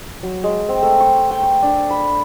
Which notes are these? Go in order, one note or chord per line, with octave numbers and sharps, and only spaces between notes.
F#3
G#3
C4
A3
C#6
G5
C#6
D4
B5